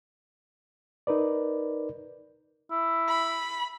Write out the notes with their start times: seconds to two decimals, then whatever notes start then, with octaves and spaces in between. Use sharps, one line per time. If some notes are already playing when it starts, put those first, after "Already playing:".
1.07 D#4 A#4 B4 D5
2.71 E4
3.08 B5